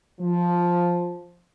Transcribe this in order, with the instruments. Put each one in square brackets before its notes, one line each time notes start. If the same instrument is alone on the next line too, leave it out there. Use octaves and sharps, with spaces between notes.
[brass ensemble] F3